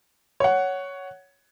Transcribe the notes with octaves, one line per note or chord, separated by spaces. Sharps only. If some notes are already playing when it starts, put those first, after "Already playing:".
C#5 F#5